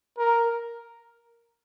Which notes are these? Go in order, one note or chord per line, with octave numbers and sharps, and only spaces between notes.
A#4